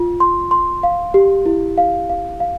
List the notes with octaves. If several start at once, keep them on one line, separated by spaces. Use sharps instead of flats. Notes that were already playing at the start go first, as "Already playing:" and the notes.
Already playing: F4
C6
C6
F5
G4
E4
F5
F5
F5